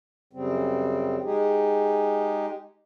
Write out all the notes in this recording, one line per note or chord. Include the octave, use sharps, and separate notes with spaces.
F#2 C#3 G3 C4
G#3 D#4 G4 G#4